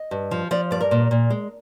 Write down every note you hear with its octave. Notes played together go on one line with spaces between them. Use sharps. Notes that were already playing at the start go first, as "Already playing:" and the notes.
Already playing: D#5
G2
F3
F3 D5
G2 D5
A#4
A#2
A#2
G#3